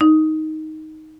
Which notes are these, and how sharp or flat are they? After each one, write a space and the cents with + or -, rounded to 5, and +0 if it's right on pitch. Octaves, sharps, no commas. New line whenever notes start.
D#4 +5